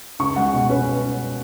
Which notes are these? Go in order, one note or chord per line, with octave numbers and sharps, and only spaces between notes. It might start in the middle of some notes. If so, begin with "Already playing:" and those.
C#2 C#6
G#3 F#5
B2 F#5
C#4 B4